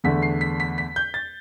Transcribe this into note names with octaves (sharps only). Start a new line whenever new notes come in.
E2 D3 A3 B6
C7
B6
B6
B6
G6
A6